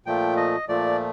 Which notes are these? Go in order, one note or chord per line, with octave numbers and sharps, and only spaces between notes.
A#2 F3 A3 G5
D#5
A#2 F3 A3 D5